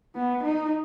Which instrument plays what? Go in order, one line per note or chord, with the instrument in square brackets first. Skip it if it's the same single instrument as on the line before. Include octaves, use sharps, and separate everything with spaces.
[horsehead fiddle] B3
D#4